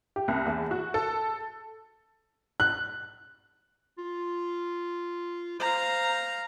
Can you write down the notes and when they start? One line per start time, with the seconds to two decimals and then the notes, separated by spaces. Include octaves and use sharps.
0.16 G4
0.28 C2
0.46 E2
0.71 F#4
0.94 A4
2.60 F#6
3.98 F4
5.60 C5 F5 A#5